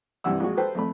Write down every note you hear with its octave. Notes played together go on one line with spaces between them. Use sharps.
G2 C3 E3 F#5 E6
A#1 G#3 F#4
A4 B4 C5 G5
F2 A3 B5